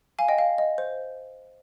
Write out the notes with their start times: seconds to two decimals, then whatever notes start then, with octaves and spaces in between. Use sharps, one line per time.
0.19 F5 G#5
0.28 D#5 G5
0.39 F5
0.58 D#5
0.78 C5